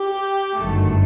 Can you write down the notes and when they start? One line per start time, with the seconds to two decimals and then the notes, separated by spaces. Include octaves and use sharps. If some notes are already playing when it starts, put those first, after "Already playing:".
Already playing: G4
0.60 G1 F#2 D#3 F#3 A3